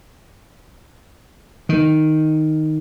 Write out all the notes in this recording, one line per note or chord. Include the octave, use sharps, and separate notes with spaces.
D#3